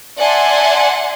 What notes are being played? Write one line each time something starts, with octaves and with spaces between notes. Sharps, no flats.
D5 E5 F#5 G#5 A5 C6